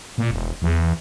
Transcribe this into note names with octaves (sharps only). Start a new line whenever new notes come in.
A#2
E1
E2